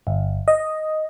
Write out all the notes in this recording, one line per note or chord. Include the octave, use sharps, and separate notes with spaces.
G1
D#5